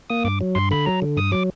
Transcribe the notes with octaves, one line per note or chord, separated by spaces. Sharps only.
A#3 D#6
G2 D6
F#3
G2 C6
D3 B5
F#3 A#5
D3
G2 D#6
F#3 D6